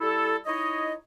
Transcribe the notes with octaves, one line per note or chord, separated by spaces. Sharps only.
G3 E4 A4
D#4 E4 C#5 D#5